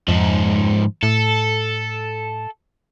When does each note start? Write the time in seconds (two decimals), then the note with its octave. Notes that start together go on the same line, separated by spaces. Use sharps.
0.08 F2 G#2 F3
1.03 A2 A4